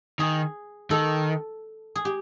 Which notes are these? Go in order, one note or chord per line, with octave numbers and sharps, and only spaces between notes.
D#3 G#4
D#3 A4
G#4
G4